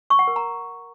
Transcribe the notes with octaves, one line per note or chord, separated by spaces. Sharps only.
C#6
F#5
A#4
A#5